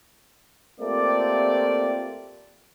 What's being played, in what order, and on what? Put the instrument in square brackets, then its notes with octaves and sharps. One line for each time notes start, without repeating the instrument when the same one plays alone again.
[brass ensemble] A3 A#3 C4 F4 G4 D5